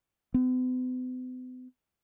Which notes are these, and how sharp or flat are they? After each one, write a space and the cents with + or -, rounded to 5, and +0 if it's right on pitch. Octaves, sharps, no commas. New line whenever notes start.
B3 +45